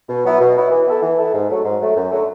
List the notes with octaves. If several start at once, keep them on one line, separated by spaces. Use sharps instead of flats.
B2
F#3 B3 E4
B2
F#3 B3 E4
E3
B3 E4 A4
E3
B3 E4 A4
G#2
F#3 A3
G#2
F#3 A3
F#2
D3 F#3 A3